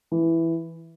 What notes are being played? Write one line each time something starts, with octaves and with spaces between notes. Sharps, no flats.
E3